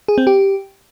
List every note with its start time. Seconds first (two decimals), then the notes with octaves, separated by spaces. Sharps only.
0.08 G#4
0.18 C4
0.27 G4